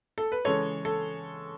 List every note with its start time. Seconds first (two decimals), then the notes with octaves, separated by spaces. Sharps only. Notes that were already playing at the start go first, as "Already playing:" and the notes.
0.18 A4
0.32 B4
0.45 C#3 E3 G#3 A4 C#5
0.85 A4